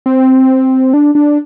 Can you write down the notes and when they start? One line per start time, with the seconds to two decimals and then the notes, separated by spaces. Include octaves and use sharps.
0.06 C4
0.94 D4
1.15 D4